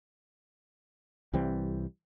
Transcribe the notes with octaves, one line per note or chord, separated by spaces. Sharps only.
C2 E3 G3 C4